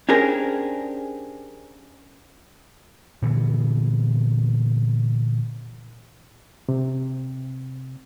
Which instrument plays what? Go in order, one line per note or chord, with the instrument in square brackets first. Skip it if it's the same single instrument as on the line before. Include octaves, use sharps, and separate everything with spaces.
[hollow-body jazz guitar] C#4 D4 G4 G#4 A#4 C5
[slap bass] A#2 D3 E3 B3
[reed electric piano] C3